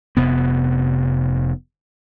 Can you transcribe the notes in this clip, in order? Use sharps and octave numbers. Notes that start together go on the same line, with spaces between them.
F1 C3 B3